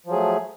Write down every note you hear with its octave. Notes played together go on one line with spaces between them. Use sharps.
F3 F#3 A3 G#4